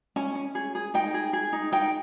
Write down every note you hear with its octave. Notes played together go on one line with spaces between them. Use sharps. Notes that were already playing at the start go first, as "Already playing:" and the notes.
C#4 G#5
C#4
G#4
G#4
D#4 G5
G#4
G#4
D#4
D#4 G5